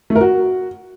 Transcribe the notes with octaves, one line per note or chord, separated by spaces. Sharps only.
A3
A#4
F#4